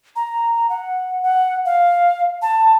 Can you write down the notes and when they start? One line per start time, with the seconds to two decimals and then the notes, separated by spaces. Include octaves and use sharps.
0.16 A#5
0.70 F#5
1.23 F#5
1.66 F5
2.42 A5